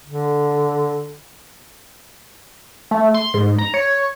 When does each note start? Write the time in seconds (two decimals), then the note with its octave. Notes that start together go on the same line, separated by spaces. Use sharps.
0.06 D3
2.91 A3
3.14 C6
3.34 G#2
3.59 A#5
3.74 C#5